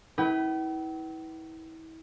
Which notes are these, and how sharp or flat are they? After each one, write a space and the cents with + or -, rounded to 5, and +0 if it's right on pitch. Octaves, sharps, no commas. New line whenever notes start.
E4 -35 B4 +0 G5 -45